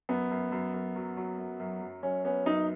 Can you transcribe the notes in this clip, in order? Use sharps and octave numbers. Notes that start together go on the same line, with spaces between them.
F#2 B3
F#2
F#2
F#2
F#3
F#3
F#2
F#2
F#2
F#2 C#4
B3 C#4
F#2 D#4